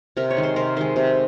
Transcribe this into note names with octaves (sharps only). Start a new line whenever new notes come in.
C3 A#4
C#5
D#3 G#3
C5
C3 A#4
D#3 G#3 C5
C3